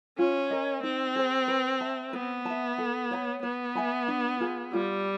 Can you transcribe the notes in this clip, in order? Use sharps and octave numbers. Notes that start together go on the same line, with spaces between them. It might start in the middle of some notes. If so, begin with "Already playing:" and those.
C#4 F4
A#4 D#5
C4 D#4
G#4 C5
B4
E5 A5
B3 B4
E5 A5
A4
C#5 F#5 B5
B3 B4
E5 G#5 B5
D4
F4 G#4
G3 F4